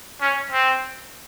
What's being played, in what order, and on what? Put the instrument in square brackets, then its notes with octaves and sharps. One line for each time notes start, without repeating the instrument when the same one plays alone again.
[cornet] C#4
C4